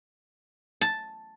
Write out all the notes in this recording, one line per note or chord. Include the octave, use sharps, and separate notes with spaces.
A5